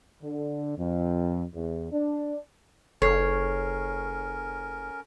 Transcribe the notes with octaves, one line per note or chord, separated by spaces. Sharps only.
D3
F2
E2
D4
F#1 C#4 A4 A#4 C#5 C7